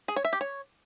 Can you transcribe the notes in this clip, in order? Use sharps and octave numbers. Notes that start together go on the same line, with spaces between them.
G#4
C#5
E5
G4
C#5